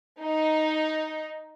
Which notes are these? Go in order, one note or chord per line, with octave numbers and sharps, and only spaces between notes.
D#4